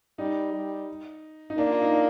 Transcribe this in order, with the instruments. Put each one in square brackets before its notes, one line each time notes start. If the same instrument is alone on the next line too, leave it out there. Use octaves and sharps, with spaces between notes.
[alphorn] G3 [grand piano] D#4
[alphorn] G3
[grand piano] D#4
[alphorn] A#3 [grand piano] D4
[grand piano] F4
D#4
D4